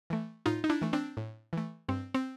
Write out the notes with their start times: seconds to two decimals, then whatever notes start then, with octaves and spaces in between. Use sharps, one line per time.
0.10 E3 A3
0.46 A2 D#4 F4
0.64 D#4
0.69 D4 E4
0.82 E3 A3
0.93 C4 D4
1.17 A2
1.53 E3 A3
1.89 G2 C4
2.14 C4